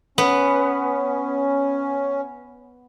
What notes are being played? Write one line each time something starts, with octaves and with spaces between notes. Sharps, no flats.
B3 C#4